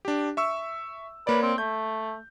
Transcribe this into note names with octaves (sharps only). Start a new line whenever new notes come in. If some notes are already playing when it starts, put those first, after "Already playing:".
D4 G4
E5 C#6 E6
A#3 B4 C#5 D5
C4
A3 G6